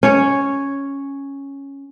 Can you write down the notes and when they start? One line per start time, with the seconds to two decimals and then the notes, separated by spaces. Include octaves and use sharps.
0.03 C#4 C#5